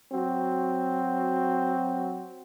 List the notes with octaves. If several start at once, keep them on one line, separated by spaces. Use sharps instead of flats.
F#3 C4 F#4